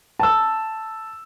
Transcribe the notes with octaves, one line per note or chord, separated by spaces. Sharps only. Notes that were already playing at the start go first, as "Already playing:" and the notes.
A5 E6